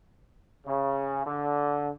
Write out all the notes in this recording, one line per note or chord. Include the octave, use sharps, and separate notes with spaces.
C#3
D3